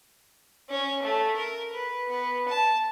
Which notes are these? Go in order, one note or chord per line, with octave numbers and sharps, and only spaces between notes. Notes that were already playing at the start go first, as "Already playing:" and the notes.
C#4
A3
A#4
B4
B3
A5